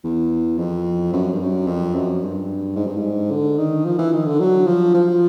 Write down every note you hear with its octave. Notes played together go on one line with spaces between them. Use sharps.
E2
F2
F#2
G2
F#2
F2
F#2
G2
G#2
G2
G#2
D3
D#3
F3
E3
D#3
D3
F#3
F3
F3